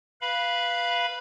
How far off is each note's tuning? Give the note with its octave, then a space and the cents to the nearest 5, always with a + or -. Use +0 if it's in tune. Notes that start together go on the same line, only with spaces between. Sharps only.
B4 +0 F5 -5 B5 -15